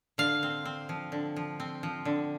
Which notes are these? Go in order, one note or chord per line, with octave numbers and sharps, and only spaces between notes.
D3 F5
C4
C4
F3
D3
F3
C4
F3
D3